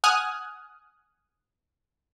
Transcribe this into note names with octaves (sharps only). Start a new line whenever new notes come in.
F#5 G#5 D#6 F6 F#6